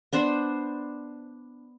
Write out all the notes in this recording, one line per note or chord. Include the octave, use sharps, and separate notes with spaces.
B3 D4 C5